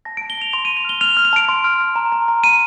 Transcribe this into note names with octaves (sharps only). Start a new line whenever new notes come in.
A5 A#6
D7
A5
G7
A5 F7
C6 F7
D#7
C6
F7
F6 G7
F6 F7
F6
F7
A5 D7
C6
F6
C6
A#5
A#5
A#5
A#5 D#7